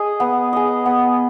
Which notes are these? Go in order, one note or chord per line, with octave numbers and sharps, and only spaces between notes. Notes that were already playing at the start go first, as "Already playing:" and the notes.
Already playing: G#4 D#5
B3
G#4 D#5
B3